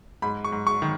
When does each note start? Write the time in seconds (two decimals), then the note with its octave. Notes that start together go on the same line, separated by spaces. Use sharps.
0.22 G#2 B5
0.44 C#6
0.52 G#2
0.67 C#6
0.82 D#3